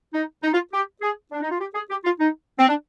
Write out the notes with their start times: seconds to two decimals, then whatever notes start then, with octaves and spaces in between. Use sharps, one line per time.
0.14 D#4
0.43 D#4
0.53 F4
0.72 G4
1.02 G#4
1.32 D4
1.42 D#4
1.51 F4
1.60 G4
1.75 G#4
1.90 G4
2.05 F4
2.19 D#4
2.59 C4
2.68 D4